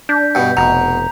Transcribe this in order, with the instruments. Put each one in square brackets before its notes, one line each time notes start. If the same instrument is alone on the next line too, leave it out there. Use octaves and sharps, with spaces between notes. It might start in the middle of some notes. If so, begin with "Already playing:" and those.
[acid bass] D4 [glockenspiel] G6 B6
[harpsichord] G2 B2
[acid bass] F1 [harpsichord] B2 [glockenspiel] A#5 F7